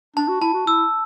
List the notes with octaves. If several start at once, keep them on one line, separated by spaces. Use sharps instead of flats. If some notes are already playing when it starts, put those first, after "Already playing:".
D4 A5
F#4
E4 A5
F#4
E4 E6